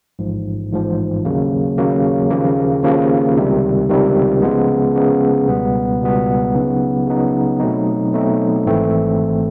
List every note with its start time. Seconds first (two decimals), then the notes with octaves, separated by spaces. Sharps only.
0.19 A1 G#2 F3
0.71 A1 G#2 F3
1.25 D#2 C#3 F#3 A#3
1.78 D#2 C#3 F#3 A#3
2.30 D#2 C#3 F3 A#3
2.84 D#2 C#3 F3 A#3
3.36 C#2 C3 D#3 G3
3.89 C#2 C3 D#3 G3
4.42 C#3 F3 G#3 B3
4.95 C#3 F3 G#3 B3
5.48 C#2 B2 G3 B3
6.01 C#2 B2 G3 B3
6.54 C#3 F#3 B3 D#4
7.07 C#3 F#3 B3 D#4
7.59 B2 F#3 A3 C4 D#4
8.13 B2 F#3 A3 C4 D#4
8.66 G#1 G#2 E3 A3 C4